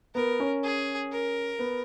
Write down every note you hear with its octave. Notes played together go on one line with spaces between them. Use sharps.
B3 A#4
C#4
G#4
A#4
B3